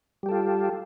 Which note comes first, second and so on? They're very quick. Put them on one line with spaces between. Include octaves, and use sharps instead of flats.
G3 G4 A4 F4